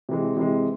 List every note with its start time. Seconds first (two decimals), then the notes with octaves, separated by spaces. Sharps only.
0.09 C3 E3 G#3
0.37 C3 E3 G#3